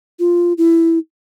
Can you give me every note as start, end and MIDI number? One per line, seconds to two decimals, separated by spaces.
0.19 0.53 65
0.58 0.99 64